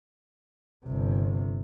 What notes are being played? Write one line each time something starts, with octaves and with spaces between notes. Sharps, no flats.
G1 C3